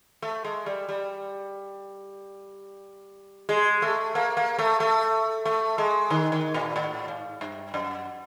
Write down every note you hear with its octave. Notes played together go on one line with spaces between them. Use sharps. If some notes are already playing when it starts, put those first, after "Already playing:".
A3
G#3
G3
G3
G#3
A3
A#3
A#3
A3
A3
A3
G#3
D#3
D#3
A#2
A2
G#2
G2
F#2